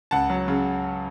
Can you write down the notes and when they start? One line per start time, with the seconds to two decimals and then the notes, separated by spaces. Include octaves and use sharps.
0.11 C#2 F#5 A5
0.30 F#3
0.48 C#3